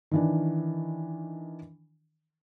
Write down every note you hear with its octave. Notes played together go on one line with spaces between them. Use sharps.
D#3 E3 D4